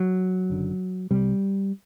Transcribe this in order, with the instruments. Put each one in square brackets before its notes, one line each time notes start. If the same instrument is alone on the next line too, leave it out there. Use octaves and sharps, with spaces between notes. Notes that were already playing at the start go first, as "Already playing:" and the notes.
Already playing: [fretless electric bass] F#3
F#1 F#2 D3
C2 C3 G3